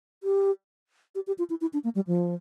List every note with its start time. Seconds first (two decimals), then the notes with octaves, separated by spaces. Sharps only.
0.23 G4
1.15 G4
1.27 G4
1.38 F4
1.50 E4
1.61 E4
1.73 D4
1.84 A#3
1.95 G3
2.07 F3